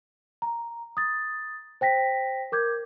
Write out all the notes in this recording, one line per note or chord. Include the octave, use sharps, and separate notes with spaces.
A#5
D#6 A6
C5 G5 A#6 B6
A#4 D6 G6 G#6